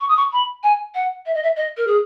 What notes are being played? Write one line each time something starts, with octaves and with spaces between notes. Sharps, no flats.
C#6
D#6
C#6
B5
G#5
F#5
E5
D#5
E5
D#5
A#4
G#4